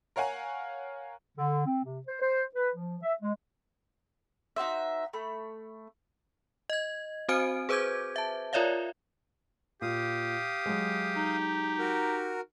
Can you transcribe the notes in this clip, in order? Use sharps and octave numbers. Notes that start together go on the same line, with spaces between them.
A#4 C#5 F5 F#5 G#5 A#5
D3
C4
C3
C5
C5
B4
F3
E5
G#3
D#4 F#4 C5 E5
A3 B5
D#5 G#6
C4 F#4 C5 G#5 F6 D7
G#4 B4 C5 D6 G6 G#6
E5 A5
F4 A#4 C#5 D5 E5 F5
A#2 G4 F5 D#6
F#3 G#3
D#4
F#4 A#4